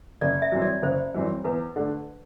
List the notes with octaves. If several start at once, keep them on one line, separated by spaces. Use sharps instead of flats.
F#1 D5
E5
F#2 E3 G3 C4
D5
F#1 C5
F#2 E3 G3 C4
E2 B4
D3 A3